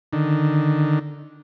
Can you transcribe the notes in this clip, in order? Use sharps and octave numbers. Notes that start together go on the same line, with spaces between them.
D3 D#3